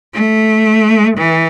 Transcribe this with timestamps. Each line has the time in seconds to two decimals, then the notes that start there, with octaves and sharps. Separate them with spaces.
0.14 A3
1.17 E3